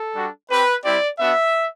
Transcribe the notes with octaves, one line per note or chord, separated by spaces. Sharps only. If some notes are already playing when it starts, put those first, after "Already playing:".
Already playing: A4
G3 D4 F#4
C4 G4 B4
G3 C4 E4 G4 D5
B3 D4 F#4 E5